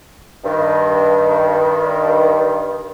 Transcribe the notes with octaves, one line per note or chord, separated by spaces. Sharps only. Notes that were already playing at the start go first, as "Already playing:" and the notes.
G2 D#3